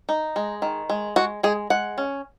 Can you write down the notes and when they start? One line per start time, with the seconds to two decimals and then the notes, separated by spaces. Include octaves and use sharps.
0.09 D#4
0.36 G#3
0.62 D#3
0.90 G#3
1.16 G#3 F#4
1.43 G#3 G#4
1.70 G#3 F#5
1.98 C#4